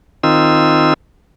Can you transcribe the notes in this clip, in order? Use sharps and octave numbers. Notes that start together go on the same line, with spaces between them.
D#3 C4 D#4 F4 E6